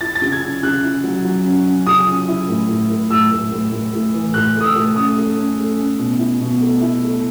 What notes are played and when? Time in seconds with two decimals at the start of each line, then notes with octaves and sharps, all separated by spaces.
0.01 E4 A6
0.15 A6
0.22 C#3
0.32 G#6
0.42 C#4
0.63 C#3 F#6
0.84 E4
1.04 F#3
1.25 F#3
1.45 C#4
1.66 C#4
1.87 C#3 D#6
2.07 C#4
2.28 E4
2.49 A2
2.69 A2
2.90 A2
3.10 A2 E6
3.31 A2
3.52 A2
3.72 A2
3.93 A2
4.14 E3
4.34 A2 F#6
4.55 A3
4.61 D#6
4.65 E6
4.76 A2
4.96 C#4 D#6
5.17 A3
5.38 C#4
5.58 A3
5.79 C#4
5.99 B2
6.19 E4
6.40 B2
6.61 A3
6.82 E4
7.02 A3